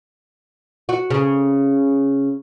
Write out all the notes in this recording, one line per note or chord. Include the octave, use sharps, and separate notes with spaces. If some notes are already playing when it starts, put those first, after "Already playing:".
F#4
C#3